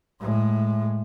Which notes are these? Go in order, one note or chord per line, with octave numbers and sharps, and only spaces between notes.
A2 G#3